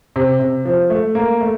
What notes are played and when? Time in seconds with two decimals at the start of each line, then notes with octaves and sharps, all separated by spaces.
0.16 C3
0.40 C3
0.65 F3
0.90 A3
1.15 A#3
1.41 A3